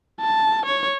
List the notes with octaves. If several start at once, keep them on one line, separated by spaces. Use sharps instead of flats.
A5
C#5